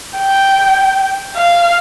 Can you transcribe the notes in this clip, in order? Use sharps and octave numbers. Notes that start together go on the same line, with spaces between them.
G5
F5